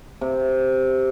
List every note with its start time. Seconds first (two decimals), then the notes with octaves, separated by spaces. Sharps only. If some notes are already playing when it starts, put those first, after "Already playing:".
0.21 C3